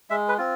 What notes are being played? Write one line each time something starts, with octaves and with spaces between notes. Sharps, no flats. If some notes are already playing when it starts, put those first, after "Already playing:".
G#3 E5
B4
C4 F4